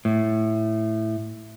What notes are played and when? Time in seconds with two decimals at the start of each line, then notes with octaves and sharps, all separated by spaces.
0.05 A2